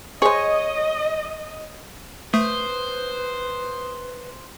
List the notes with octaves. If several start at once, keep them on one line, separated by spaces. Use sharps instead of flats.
G#4 C5 C#5 D#5
A3 B4 C5 D#6